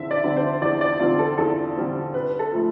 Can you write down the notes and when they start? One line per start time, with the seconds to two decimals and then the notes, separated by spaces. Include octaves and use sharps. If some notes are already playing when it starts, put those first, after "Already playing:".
Already playing: E2 D3 C4 E5
0.11 D5
0.24 D3 G3 C4
0.36 C5
0.62 E2 D5
0.81 D5
1.00 D3 G3 C4 F4
1.19 A4
1.38 E2 A4
1.76 D3 G3 C4
2.14 C3 B4
2.39 A4
2.52 F3 A3